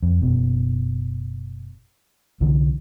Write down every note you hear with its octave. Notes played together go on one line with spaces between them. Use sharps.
F2
F#1 B2
C2 D3 E3